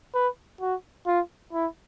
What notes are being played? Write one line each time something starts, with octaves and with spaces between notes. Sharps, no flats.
B4
F#4
F4
E4